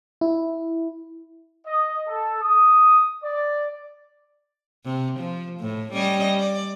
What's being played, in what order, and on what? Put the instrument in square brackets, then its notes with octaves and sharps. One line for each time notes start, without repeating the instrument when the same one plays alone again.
[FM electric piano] E4
[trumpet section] D#5
A4
D#6
D5
[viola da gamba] C3
F3
A2
G3 C#4 D#5
D5